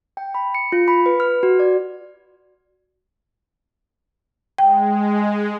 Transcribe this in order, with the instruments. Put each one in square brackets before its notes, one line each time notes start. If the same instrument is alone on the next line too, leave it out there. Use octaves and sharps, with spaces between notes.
[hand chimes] G5
B5
C#7
F4
B5
B4
F6
F#4
D5
[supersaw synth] G#3 [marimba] G5